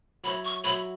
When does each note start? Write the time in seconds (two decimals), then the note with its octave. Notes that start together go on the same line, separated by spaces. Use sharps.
0.24 F#3 E4 C#5 B5
0.45 C#6
0.64 F#3 E4 C#5 B5